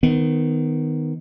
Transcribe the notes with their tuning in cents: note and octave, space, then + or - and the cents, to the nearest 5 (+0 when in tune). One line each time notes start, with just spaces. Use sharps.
D#3 +0 B3 +25